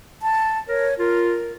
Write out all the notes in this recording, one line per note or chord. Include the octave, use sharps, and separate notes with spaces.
A5
A#4 C#5
F4 A#4